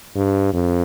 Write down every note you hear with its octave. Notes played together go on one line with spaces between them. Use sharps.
G2
F2